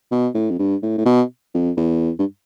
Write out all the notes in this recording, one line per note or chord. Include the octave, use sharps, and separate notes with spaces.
B2
A2
F2
G2
A2
A2
B2
F2
E2
G2